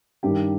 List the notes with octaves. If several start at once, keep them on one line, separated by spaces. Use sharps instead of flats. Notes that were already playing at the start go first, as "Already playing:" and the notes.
G2 D#3 G4